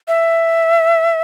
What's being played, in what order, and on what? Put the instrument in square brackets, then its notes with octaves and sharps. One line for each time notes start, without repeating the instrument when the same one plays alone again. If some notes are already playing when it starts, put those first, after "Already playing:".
[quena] E5